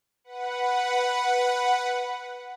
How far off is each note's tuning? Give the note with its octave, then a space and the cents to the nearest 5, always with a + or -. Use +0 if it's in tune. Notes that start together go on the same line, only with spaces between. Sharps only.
B4 +0 F#5 +0